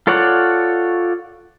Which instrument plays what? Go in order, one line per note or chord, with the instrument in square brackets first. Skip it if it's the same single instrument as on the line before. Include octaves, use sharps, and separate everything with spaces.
[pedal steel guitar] F4 A4 C#5 D5 F#5